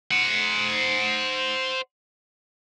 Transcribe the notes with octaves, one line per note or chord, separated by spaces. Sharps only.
C5 F#5